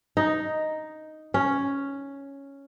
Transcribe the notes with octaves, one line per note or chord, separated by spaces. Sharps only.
D#4
C#4